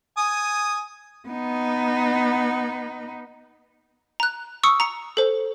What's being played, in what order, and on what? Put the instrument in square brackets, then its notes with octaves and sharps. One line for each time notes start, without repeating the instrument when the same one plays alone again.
[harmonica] G#5 D#6
[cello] B3 D#4
[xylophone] A#5 F#6
C#6 D#6 E6 C#7
A#5 C#7
A4 C5